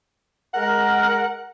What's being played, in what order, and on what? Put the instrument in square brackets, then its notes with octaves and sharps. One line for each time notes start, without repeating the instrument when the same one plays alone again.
[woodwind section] G#3 A#4 [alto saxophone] F#5